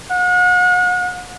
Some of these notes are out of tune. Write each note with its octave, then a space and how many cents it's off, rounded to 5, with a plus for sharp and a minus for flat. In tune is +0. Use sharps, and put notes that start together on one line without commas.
F#5 -40